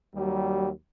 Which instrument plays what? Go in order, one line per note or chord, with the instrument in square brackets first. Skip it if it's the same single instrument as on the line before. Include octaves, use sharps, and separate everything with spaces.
[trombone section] D#2 F#3 G3